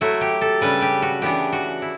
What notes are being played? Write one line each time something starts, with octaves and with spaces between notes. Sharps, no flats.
F#3 A3 E4 F#4
G4
A4
C#3 G3 D4 B4
G4
F#4
C#3 E3 B3 D4 G4
F#4
E4